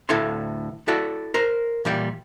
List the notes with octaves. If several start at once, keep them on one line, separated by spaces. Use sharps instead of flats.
D2 A2 E4 A4 F5 C6
E4 F#4 A4 D5
A#4 C5
A#2 E3 G3 G5